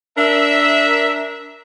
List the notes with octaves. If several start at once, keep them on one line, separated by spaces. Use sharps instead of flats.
D4 A#4 E5